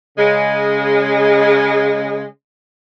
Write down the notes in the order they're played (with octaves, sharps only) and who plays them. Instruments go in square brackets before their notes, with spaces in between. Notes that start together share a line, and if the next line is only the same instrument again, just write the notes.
[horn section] C#3 G#3